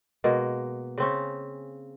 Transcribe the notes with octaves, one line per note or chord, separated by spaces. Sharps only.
B2 G#3 A#3
C#3 C4 C#4